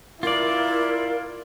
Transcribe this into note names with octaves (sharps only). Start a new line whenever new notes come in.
E4 F4 A#4 D5